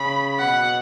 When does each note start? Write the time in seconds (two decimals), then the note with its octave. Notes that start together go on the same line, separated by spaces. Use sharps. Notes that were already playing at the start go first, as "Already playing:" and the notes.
Already playing: C#3 B5
0.38 B2 F#5